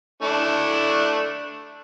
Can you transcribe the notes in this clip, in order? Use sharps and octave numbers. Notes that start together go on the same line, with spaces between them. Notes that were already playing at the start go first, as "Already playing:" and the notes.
A3 D4 E4